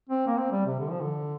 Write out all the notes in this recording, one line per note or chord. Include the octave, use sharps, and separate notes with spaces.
C4
A#3
C4
G3
C3
D3
F3
D3